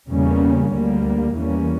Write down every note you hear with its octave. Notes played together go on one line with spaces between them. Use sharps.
E2 C#3 G3 A#3 C#4
D2 D3 G3 A#3
E2 E3 G3 A#3 C#4